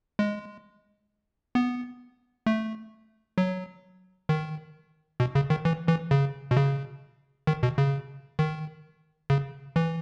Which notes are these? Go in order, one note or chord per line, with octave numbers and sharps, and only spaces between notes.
G#3
B3
A3
F#3
D#3
B2
C#3
D#3
E3
E3
C#3
B2
C#3
D#3
B2
C#3
D#3
C#3
E3